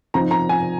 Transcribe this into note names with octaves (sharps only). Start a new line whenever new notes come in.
F3 C4 D#4 A#5
A#5
G#5